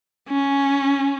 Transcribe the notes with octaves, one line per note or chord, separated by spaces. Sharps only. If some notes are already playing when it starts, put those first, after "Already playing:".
C#4